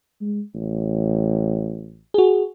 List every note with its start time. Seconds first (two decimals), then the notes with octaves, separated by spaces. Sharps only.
0.21 G#3
0.54 A1
2.14 F#4 G#4